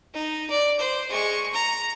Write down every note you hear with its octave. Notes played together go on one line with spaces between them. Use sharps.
D#4
D5
C5
G#3 C#6
A#5